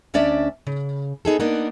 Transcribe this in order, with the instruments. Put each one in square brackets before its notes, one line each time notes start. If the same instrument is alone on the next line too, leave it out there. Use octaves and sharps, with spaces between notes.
[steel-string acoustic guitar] D2 C#4 D4 D5 E5
C#3
B3 D#4 G#4 A4
A#3 B3 D4 D#4 A#4